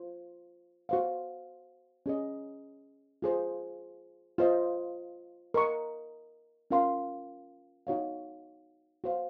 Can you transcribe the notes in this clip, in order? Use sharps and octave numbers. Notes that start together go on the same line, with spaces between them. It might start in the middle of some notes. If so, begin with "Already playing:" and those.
Already playing: F4 C5
F#4 C5 F5
C#4 G#4 D#5
F4 G#4 C5
F4 C5 D#5
A#4 D#5 A#5 C#6
C#4 F4 A#4 F5 C6
D#4 F#4 C#5 F5
F#4 C5 F5